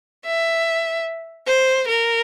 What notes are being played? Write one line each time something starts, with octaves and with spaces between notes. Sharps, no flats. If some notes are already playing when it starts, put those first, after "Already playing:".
E5
C5
A#4